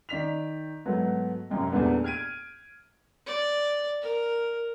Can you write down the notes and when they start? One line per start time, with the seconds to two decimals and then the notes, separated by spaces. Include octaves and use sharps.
0.09 D#3 D5 B6 F7
0.86 G#2 F#3 A3 B3
1.50 A1 F#2 C3 A#3
1.72 E2 A#2 G3 A3 B3 D4
2.04 F6 G#6 D7 D#7
3.27 D5
4.02 A#4